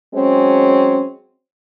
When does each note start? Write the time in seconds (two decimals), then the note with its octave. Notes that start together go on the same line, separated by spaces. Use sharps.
0.14 F#3 G#3 C4 C#4